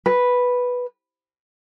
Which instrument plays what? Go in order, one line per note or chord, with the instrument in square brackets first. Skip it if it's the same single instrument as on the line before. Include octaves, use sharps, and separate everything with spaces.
[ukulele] B4